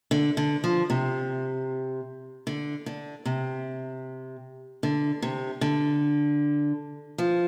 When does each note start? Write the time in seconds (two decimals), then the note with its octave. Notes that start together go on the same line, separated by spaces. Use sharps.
0.11 D3
0.37 D3
0.64 F3
0.90 C3
2.47 D3
2.86 D3
3.26 C3
4.83 D3
5.22 C3
5.61 D3
7.18 F3